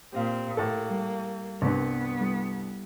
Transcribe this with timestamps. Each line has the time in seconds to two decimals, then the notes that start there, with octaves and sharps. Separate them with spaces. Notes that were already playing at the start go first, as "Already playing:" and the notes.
0.12 A#2 C4 G4 D#5 F5
0.57 A2 A#3 A4
0.90 G3
1.62 C2 G2 B3
2.20 G3 E4 A4